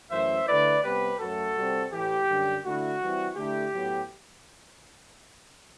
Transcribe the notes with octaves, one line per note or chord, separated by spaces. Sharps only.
F#2 E3 A3 C5 E5
D3 A3 E4 B4 D5
C3 G3 B3 G4 B4
F#2 F#3 A3 F#4 A4
C3 G3 C4
A2 E3 A3 E4 G4
F#2 D3 G3
D3 A3 E4 F#4
E3 G3 C4 E4
D3 A3 E4 G4
A2 F#3 B3